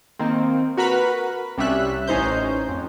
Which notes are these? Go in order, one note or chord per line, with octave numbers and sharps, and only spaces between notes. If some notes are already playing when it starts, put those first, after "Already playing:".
D#3 A#3 C4
F#4 A#4 B4 B5
C2 G3 C#4 E5 F#6 B6
A1 C#4 D#4 C5 G6
F2